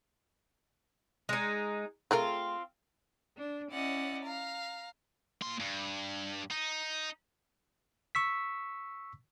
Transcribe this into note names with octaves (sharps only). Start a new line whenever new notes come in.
G#3 D#4
A3 C4 F4 G#4 A#4
D4
C#4 E4 D5 D#5 F#5
F5 A#5
A#3 C6
G2
D#4
C#6 E6 B6